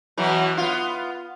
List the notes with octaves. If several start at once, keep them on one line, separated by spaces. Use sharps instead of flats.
B2 E3 F#3
B3 F4